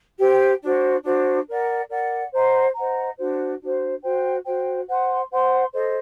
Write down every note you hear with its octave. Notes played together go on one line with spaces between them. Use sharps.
G4 C5 G5
D4 F#4 C5
D4 F#4 C5
A#4 D5 F#5
A#4 D5 F#5
C5 D#5 F#5 A#5
C5 D#5 F#5 A#5
D4 F#4 C5
D4 F#4 C5
F#4 C5 G5
F#4 C5 G5
C5 F#5 C6
C5 F#5 C6
A4 C5 D#5